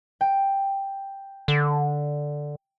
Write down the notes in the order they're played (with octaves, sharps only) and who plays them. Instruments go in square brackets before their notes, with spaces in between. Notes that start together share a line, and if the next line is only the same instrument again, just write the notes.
[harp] G5
[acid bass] D3